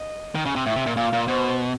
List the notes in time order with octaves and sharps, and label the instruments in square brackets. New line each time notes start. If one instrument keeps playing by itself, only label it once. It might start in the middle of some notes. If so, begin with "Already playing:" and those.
Already playing: [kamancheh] D#5
[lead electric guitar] D#3
C#3
C3
[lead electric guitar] A2 [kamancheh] E5
[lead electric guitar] C3
A#2
[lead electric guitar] A#2 [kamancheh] F5
[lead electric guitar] A#2
[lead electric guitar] B2 [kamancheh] C5